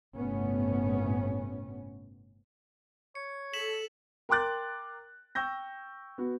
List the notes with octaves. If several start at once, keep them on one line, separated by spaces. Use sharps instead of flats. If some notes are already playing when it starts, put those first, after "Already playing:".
G1 A2 C3 A3 B3 C#4
C#5 C#7
A4 B6 E7 F#7
A#4 G5 C6 D6 F#6 A6
G5 C#6 E6 G6 A#6
B3 F#4